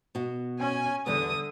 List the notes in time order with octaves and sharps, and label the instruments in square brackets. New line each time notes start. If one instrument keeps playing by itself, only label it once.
[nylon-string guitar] B2 F#4
[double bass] C#4 [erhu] G#5
[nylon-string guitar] E2 G3 B3 [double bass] D3 [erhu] D#6